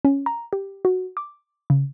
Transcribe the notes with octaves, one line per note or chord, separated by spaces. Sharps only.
C#4
A#5
G4
F#4
D6
C#3